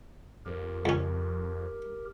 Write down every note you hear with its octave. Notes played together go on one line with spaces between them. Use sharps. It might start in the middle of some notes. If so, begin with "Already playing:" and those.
F2 G4 A#4
C#2 C#4